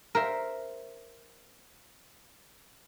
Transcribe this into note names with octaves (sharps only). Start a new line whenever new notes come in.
A#4 C5 E5